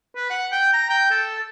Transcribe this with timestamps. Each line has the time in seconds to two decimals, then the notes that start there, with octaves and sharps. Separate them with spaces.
0.16 B4
0.30 F#5
0.52 G5
0.74 A#5
0.90 G5
1.11 A4